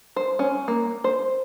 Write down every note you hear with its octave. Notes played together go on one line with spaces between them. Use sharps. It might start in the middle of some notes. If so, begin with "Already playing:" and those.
C5
C#4
A#3
C5